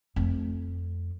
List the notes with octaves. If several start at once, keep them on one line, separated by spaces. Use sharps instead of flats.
F2 A3